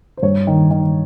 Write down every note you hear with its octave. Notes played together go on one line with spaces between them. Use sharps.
C5
G2 C#5
D#3
D#3